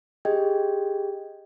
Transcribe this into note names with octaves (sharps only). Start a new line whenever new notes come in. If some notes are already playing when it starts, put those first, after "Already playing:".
G4 G#4 D#5 G5 G#6